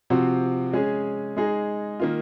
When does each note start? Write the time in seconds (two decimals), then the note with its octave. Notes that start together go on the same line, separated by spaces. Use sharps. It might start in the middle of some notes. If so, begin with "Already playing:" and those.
0.10 C3 F3 C4 F#4
0.73 G#3 C#4 G#4
1.37 G#3 D#4 G#4
2.00 D#3 A#3 F4